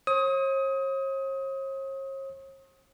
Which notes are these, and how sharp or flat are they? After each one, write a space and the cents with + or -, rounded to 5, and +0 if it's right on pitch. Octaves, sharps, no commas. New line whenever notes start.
C#5 -45 D#6 +25